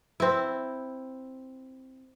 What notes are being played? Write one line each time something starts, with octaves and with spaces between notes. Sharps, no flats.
C4 E4